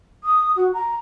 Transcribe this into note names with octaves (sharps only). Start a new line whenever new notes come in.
D#6
F#4
A#5